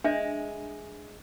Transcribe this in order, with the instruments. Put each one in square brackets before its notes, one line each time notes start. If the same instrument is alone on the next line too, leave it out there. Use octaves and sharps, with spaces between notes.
[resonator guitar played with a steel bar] G#3 [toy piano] D4 E5